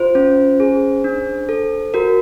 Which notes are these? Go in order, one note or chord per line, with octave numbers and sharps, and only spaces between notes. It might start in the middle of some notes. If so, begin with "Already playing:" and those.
Already playing: F4 C5
C#4
G#4
D4
A4
F#4 A#4